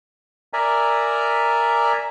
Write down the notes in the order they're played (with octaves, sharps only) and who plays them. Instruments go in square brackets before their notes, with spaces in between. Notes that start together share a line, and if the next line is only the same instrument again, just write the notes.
[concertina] A#4 D5 E5 G#5 A#5